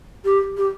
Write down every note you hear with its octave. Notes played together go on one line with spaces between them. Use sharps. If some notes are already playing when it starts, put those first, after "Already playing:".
G4
G4